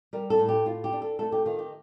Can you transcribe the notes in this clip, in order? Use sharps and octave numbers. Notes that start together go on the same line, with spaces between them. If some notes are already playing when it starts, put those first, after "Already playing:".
G3 A#4
A4
A2
G4
A2 F4
G4
D4
A4
A3 A4
G4
D#3 F4
G4